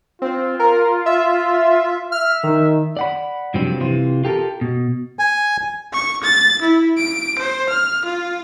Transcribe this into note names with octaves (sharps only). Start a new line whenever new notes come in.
C4 F4
A#4
E5
E5 F6
D#3
D5 F#5 B5
G2 C3 F3 F#3 C4
C3 E3 F4
F4 G4 A4 A#4
B2
G#5
C#6
A6
E4
D7
C5
F6
F4